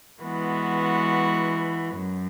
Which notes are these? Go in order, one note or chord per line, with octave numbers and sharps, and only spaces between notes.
E3 G#3 B3 F#4
F#2